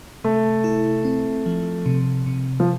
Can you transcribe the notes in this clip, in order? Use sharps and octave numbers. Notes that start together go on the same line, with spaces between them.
C3 A3
E4
C4
F3
C3
C3
F3